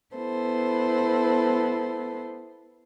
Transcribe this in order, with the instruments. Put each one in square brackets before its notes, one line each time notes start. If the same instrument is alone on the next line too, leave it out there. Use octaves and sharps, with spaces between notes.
[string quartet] B3 E4 A4 C5